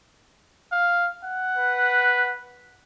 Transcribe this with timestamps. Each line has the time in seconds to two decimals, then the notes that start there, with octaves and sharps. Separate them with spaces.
0.72 F5
1.24 F#5
1.58 B4